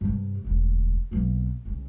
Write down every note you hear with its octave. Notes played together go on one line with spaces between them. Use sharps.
G2 C3
E1 D2
B1 A#3
C2 C#3